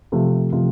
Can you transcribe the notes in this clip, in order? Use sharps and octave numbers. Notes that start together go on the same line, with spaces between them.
C3 F3 A3
C3 F3 A3